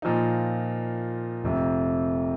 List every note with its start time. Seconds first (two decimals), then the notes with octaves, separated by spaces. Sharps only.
0.02 A#2 F3 D#4
1.44 F1 F2 C3